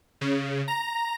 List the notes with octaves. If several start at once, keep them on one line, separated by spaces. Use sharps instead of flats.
C#3
A#5